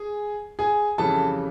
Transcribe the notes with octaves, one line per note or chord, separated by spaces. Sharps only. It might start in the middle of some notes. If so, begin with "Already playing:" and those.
Already playing: G#4 G#5
G#4 G#5
F2 C#3 E3 G3 A4 A5